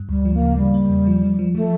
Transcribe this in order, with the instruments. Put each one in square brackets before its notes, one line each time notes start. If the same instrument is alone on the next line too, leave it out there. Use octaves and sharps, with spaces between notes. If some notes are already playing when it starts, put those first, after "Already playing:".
Already playing: [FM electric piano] G2
[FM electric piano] D2 [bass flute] G3
[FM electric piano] F3
[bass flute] A#3
[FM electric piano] C#3
[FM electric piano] C#3 [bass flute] G3
[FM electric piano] A#3
E2
F3
F3
F3
[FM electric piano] F3 [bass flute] A3